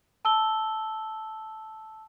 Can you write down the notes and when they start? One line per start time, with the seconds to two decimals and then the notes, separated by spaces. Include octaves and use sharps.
0.25 A5 E6 G7